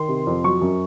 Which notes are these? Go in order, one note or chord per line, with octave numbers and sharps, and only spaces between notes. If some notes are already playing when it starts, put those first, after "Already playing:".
Already playing: D#3 C6
C3
F2
F#3 C#6
F#2